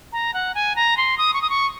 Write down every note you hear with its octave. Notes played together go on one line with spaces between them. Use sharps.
A#5
F#5
G#5
A#5
C6
D#6
C#6
D#6
C#6